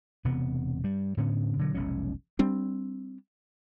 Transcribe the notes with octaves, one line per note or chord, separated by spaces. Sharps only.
E1 C3 B3
G2 G3
A2 D3 B3 C#4
B2 D3 F#3
F1 B1 G#3 C#4
G3 C4 D4